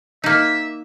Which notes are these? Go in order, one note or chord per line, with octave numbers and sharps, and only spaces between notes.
A#3 D#4 E5